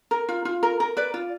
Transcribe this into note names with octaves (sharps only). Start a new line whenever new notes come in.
A#4
F4
F4
A#4
A#4
B4 D5
F4